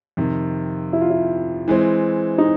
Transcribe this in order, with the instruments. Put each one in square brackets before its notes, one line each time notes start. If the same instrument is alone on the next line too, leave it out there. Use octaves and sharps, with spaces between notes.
[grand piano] F2 C3 D#3
[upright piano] E4
F4
E4
[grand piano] E3 G#3 C4
[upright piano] D#4